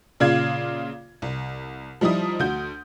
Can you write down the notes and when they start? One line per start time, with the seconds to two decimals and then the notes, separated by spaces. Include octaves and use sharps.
0.20 A#2 C#3 F4 D5 F5 G#6
1.22 C2
2.01 F3 G3 D#4 E4 D#6
2.39 D2 F#4 G6